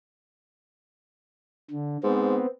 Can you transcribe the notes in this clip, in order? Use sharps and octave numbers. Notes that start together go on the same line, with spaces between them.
D3
G#2 B3 C4